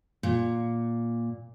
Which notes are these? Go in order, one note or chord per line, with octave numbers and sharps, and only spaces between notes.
A#2